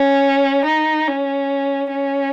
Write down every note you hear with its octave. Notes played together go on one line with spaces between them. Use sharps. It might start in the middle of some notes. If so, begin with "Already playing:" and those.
Already playing: C#4
D#4
C#4
C#4